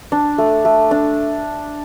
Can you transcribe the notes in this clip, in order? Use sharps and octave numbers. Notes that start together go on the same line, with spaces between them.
D4
A3
A3
D4